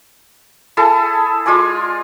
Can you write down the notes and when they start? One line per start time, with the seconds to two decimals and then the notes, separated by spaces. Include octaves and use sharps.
0.77 E4 G#4 A4 A5
1.46 G#3 F4 D5 G#5